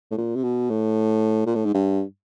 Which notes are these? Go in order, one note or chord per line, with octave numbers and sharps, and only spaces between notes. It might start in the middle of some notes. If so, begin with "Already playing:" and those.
A2
A#2
C3
B2
A2
A#2
A2
G#2
G2